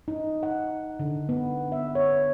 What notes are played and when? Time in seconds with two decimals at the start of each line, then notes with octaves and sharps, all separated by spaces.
0.08 D#4
0.43 F#5
0.99 D3
1.29 B3
1.72 E5
1.95 C#5